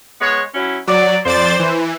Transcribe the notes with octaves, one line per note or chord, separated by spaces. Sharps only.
G#3 B3 C#5
F#3 C#4 E4
F#3 D5
F2 C5 D5 A6
E3